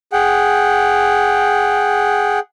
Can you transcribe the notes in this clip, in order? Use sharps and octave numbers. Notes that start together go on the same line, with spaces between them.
G#4 F#5 G5